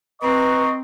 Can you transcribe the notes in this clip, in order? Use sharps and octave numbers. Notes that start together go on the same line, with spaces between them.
C4 B4 D#5 A#5 C#6